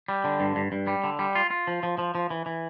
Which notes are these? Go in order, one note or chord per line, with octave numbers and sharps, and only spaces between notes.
G3
D3
G2
G2
G2
G3
D3
G3
F4
F4
F3
F3
F3
F3
E3
E3